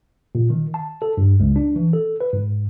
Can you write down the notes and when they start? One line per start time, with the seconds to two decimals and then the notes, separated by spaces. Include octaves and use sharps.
0.35 A#2
0.50 D#3
0.74 A5
1.02 A4
1.17 G2
1.40 C#2
1.56 D4
1.76 E3
1.93 A4
2.21 B4
2.33 G#2